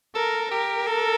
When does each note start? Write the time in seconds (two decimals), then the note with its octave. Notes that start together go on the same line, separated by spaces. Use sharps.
0.15 A4 A#4
0.51 G4 A#4
0.87 A4